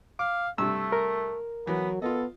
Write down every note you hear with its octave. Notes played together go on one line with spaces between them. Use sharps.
F5 D6
G2 C3 A3 E6
A#4
E3 F#3 B3
B3 F4 A4 D#5